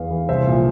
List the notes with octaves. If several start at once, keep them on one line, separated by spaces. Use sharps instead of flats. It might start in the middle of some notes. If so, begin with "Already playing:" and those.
Already playing: E2 E3 F5
E3
C2 C5 E5
A#2 F3